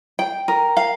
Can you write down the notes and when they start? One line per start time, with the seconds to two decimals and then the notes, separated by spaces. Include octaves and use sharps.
0.19 G5
0.48 A#4
0.77 F5